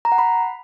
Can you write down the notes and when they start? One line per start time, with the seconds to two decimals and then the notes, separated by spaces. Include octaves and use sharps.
0.05 A#5
0.12 F#5
0.18 B5